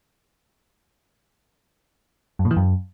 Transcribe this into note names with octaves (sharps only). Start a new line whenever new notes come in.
F#2
A#2
E3
F#2